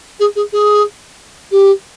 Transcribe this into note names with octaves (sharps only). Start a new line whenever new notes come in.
G#4
G#4
G#4
G4